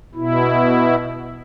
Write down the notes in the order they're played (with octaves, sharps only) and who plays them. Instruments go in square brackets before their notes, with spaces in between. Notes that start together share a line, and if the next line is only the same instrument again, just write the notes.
[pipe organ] B2 E4